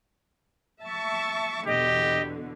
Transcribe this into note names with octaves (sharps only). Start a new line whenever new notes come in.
E5 A5 C#6
E2 B2 D3 G4 D#5